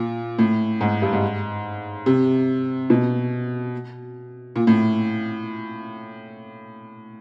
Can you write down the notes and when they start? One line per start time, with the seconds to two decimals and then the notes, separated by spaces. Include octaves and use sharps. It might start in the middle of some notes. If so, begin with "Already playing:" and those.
Already playing: A#2
0.39 A2
0.81 G#2
1.02 G2
1.13 G#2
2.06 C3
2.90 B2
4.56 A#2
4.67 A2